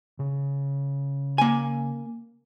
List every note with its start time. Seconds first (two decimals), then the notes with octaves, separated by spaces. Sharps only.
0.19 C#3
1.38 A#3 G#5